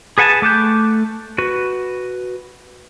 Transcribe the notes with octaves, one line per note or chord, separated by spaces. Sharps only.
G#4 B4 F#5 G#5 A5
A3 D6 F#6 G6
F#4 B4